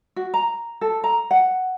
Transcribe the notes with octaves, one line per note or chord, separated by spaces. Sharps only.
F#4
A#5
A4
A#5
F#5